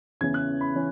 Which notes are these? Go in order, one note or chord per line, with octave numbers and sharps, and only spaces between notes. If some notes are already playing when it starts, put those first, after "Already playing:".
E2 C#3 E3 C#4 G#6
F#6
B5
C#3 E3 C#4